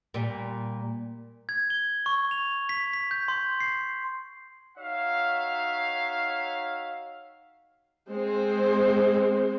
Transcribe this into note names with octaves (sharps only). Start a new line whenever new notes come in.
A#2 G3
G#6
G7
C#6
F7
B6
B6
G6
C6
C7
D#4 F#4 C#5 E5 F5
G#3 C4 C5